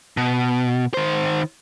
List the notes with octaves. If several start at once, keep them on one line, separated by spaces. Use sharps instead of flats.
B2
D#3 C5